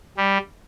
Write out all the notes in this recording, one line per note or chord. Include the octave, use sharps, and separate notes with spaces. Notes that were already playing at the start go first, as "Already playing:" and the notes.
G3